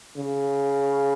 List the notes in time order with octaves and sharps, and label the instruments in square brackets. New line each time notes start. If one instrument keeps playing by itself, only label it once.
[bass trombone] C#3